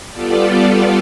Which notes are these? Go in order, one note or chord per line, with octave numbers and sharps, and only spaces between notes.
G3 B3 F4 A4 D5